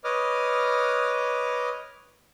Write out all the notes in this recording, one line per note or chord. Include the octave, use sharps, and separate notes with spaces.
B4 C#5 D#5 D6 D#6 F6